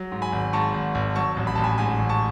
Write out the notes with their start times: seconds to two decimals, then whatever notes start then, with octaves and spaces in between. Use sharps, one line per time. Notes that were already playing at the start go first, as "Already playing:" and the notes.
Already playing: F#3
0.12 G#2
0.22 G#5 B5
0.33 G#1
0.53 G#2 A5 C#6
0.74 G#1
0.95 G#1
1.16 F#3 A5 C#6
1.37 A1
1.47 B5
1.55 A1 A5
1.64 G#5 B5
1.78 G#2 G#5 B5
1.99 A1
2.09 A5 C#6